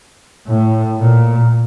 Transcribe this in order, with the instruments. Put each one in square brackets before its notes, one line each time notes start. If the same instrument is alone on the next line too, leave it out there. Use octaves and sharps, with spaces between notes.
[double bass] A2
A#2